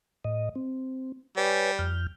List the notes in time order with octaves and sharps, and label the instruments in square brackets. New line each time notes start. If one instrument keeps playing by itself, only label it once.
[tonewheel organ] A2 D#5
C4
[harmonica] G3 [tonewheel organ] B4 C#5 G#5
[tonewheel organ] F2 F6 G6